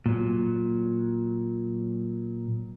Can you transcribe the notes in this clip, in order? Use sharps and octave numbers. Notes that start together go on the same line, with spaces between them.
A#2 F#3